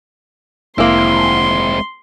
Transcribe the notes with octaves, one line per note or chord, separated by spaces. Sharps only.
F1 G#3 A#3 C4 E4 C6